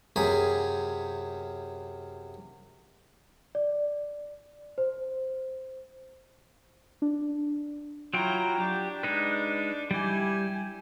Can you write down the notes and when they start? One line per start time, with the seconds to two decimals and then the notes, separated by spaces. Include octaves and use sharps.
0.16 F#2 C3 G#4 B5
3.55 D5
4.78 C5
7.02 D4
8.14 F#3 E4 F4 G5 A#5
8.60 D4 G4
9.03 G#3 D#4 B4
9.91 G3 E4 G4 G#5